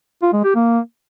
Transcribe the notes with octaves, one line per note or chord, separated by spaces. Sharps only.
F4
G#3
G4
A#3